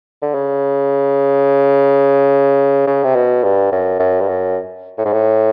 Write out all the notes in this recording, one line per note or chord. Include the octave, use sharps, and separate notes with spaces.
D3
C#3
C#3
C3
B2
G2
F#2
F#2
G2
F#2
A2
G#2
A2